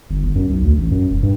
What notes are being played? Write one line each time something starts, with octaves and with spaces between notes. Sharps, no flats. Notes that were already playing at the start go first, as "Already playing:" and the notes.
G1
G1
F#2
B1
D2
A1
F#2
E1
G2